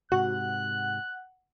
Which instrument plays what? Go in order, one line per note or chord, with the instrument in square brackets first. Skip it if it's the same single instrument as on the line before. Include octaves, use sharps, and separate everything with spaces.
[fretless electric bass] G#2 C3 [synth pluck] F#4 [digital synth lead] F#5 [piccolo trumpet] F#6